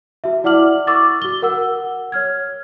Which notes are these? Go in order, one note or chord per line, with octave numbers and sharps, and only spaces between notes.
F#4 E5
E4 D5 F#5 D6 F6 F#7
C#6 D6 E6 A6
F#4 G7
A#4 F#5 E6
C#5 F6 G#6